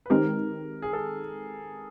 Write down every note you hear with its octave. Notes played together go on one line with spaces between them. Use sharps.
B4
D#3 G#3 C4 D#4 G4 A#4
G#4
A4